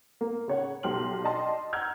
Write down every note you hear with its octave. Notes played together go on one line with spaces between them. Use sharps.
A#3
C#3 C#5 F#5
B1 G4 C6 F6 F#7
D5 D#5 G5 A5 C6
F#5 A#5 E6 F6 G6 G#6